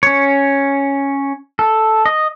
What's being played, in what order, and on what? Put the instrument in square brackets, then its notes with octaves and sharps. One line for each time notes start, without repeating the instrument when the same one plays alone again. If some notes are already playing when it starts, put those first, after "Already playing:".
[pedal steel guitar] C#4 C#5
A4
D#5